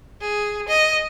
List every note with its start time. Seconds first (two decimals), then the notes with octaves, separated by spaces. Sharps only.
0.20 G#4
0.67 D#5